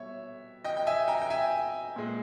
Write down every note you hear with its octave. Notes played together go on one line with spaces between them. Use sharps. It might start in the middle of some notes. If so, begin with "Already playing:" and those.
Already playing: B2 G3 C#5 E5
D#5 G5
G5
E5 G#5
G5 A#5
G5
E5 G#5
A#2 G#3